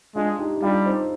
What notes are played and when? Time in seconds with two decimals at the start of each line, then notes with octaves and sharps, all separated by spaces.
0.16 G#3 D4 F4
0.39 D#4 G4
0.57 D#4
0.62 G3 D4 F4
0.86 C4 D#4